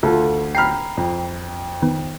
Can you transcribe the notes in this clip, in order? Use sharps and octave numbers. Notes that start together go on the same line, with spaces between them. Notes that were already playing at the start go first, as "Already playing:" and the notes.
D2 F4 A4
G5 A#5 B5 F6 C7
F2
D#3 B3